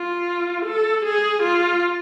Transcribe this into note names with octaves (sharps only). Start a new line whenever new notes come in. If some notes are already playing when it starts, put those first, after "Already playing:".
Already playing: F4
A4
G#4
F4